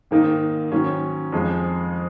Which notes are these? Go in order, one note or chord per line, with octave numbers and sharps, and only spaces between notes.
G#2 D#3 A#3 D#4
G#2 D#3 F#3 C#4
F2 F3 G#3